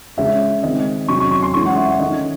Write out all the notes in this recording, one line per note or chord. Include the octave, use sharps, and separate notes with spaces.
C#3 G#3 C#4 E5
D#3 G#3 C4 D#5
C3 F#3 C#4 C#6
C#6
C#6
C6
E3 G#3 C#4 C#6
F#5
E5
F#5
D#3 A3 C#4 D#5